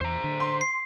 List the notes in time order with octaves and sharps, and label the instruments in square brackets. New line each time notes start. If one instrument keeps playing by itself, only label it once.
[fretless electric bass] E2 [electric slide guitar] C5 A#5
[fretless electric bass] D3
[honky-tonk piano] C6
[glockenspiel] C7